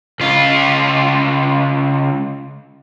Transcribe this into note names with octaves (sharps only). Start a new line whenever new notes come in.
C#2 F4